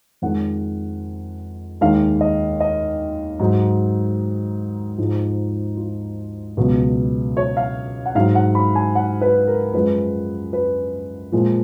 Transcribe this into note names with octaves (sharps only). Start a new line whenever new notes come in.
F2 D#3 G#3 F#5
D#2 D#3 G#3 F5
D#5
D#5
G#2 F#3 D#4
G#2 F3 G#3
F4
C#2 B2 F#3
C#5
F5
F#5
G#2 F#3 F5
F#5
B5
G#5
F#5
B4
A#4
F#2 F3 G#3 B4
B4
A#2 F3 G#3